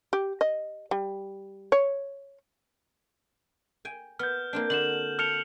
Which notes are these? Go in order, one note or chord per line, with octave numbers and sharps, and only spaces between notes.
G4
D#5
G3
C#5
G5 G#5
B3 F6 G6
A#3 C4 D4
D3 F#4 E7 F#7
A5 F6 C#7 F7